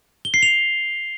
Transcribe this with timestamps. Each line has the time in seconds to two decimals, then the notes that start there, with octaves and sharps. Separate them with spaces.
0.25 G7
0.34 C7
0.43 F7